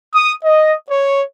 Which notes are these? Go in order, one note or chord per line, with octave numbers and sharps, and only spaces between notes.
D#6
D#5
C#5